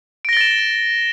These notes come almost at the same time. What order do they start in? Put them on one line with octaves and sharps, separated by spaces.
D7 A#6 G7 A6 E7